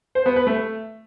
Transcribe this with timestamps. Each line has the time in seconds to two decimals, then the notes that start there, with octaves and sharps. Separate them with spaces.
0.15 C5
0.26 B3
0.36 B4
0.47 A3